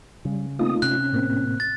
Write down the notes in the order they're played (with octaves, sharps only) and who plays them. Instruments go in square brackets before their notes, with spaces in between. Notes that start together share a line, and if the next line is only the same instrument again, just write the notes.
[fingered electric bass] C#3 [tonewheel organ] G3
[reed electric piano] A3 D#4 F4 [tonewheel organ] A#3 C4 D#6
[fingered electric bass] C3 [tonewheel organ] C#4 [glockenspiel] F#6
[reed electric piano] A2 A#3 C4
[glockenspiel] A6